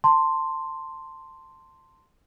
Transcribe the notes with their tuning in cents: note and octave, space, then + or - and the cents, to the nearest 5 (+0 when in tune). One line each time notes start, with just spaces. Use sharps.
A5 +25 C6 +0